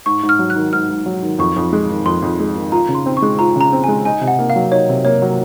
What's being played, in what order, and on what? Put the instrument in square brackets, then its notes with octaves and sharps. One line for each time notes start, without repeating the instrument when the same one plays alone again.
[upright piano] G#2 [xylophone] C#6
[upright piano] G#2
[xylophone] F6
[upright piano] F#3
[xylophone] F#6
[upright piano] D#3
[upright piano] G#2 [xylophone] F6
[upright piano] G#2
F#3
D#3
[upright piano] F2 [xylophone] C#6
[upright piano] F2
G#3
D#3
[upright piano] F2 [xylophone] C6
[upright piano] F2
G#3
D#3
[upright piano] F4 [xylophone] A#5
[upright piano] C#3
[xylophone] C6
[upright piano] C4
[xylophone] C#6
[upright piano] G#3
[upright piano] F4 [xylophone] A#5
[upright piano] C#3 [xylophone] A#5
[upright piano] C4
[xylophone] G#5
[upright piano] G#3
[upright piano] D#4 [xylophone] G#5
[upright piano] C3
[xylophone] F#5
[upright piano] A#3
[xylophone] F5
[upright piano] F#3
[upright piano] D#4 [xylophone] C#5
[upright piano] C3
[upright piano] A#3 [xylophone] C#5
[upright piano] F#3